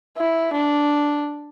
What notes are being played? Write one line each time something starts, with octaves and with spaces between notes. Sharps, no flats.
E4
D4